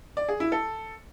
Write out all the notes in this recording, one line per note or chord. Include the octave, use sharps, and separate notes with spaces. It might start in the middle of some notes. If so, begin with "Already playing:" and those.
D5
G#4
E4
A4